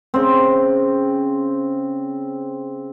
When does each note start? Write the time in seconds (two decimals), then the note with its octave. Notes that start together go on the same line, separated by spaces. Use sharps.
0.14 C#3 C4